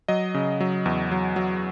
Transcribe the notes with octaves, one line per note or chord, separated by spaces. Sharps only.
F#3 D#5
C#3
F#3
E2
F#3
F#3